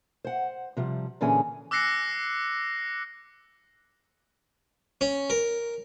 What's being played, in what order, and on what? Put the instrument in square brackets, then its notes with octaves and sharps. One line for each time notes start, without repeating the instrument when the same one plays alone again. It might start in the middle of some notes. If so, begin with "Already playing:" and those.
[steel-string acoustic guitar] C5 F#5
C3 F3 G3
A#2 D3 E3 C#4 G#4 G#5
[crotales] D6 E6 F#6 A#6 C7 C#7
[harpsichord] C#4
A#4